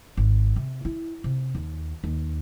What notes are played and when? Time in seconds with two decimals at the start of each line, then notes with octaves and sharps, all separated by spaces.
0.17 G#1
0.56 C3
0.85 E4
1.24 C3
1.55 D#2
2.04 D#2